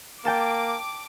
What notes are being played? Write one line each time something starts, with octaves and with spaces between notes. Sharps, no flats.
A#3 G5 A5 D6 E7